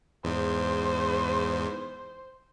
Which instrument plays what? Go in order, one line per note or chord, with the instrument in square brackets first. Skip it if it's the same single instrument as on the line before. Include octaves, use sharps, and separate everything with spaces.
[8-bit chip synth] E2 G#2 [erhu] C5